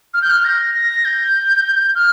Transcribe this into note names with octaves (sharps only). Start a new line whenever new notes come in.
F6
G6
F6
A#6
A#6
G6
F6